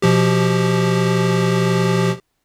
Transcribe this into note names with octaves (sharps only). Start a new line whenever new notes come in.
B2 F3 G4